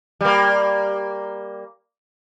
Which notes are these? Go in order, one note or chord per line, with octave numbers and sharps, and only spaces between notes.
G3 A#3